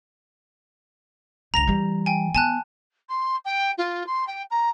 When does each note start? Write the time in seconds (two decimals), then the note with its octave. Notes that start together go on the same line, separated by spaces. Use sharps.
1.54 C#2 D3 A#5 A#6 F7
1.67 E3 G3
2.06 G5 G#5
2.35 B3 G#5 A5 F#6
3.09 C6
3.45 G5
3.78 F4
4.06 C6
4.27 G5
4.50 A#5